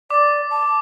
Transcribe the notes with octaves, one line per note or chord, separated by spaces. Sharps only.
D5 D6
A5